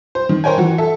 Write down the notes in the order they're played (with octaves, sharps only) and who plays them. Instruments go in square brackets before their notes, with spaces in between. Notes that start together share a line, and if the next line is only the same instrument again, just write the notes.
[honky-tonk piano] C5
D#3
A#4 C5 C#5 G5 G#5
E3 F#4
A4 E5